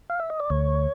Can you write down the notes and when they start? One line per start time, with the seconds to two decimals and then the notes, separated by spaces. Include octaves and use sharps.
0.10 F5
0.20 E5
0.30 D#5
0.40 D5
0.50 D2 C#5